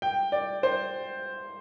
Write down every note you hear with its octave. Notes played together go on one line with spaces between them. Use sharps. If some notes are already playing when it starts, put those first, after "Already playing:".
G5
D5
C5